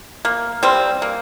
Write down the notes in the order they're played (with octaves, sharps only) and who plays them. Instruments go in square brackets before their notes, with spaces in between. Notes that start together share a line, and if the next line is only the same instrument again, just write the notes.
[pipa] A#3
G3 C4
A#3